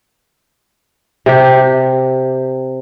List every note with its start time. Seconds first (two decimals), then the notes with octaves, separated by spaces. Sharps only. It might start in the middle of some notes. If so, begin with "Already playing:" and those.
1.26 C3 G4